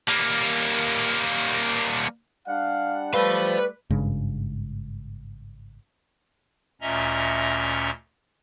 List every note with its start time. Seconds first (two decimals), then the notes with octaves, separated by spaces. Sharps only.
0.08 G3 A#3
2.48 G3 D4 F5 F#5
3.14 G3 A3 B4 C5 D5 F5
3.90 G#1 G2 C#3 G#3
6.81 D2 A#2 C#4 D#5 E5 A#5